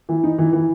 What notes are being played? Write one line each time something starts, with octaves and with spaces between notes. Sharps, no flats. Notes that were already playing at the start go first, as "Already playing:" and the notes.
E3
D#4
E3
E3